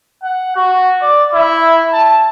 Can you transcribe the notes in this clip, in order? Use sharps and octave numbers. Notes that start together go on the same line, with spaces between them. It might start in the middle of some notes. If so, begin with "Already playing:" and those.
F#5
F#4
D5
E4
A5